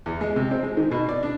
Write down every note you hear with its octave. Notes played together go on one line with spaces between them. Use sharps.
E2
G#3
C3
C4
G#3
D#3
B2
D5
D4